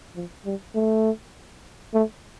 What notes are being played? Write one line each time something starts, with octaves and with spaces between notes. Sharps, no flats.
F3
G3
A3
A3